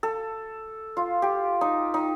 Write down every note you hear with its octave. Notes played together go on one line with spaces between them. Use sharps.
A4
F4
G4
D#4
D#4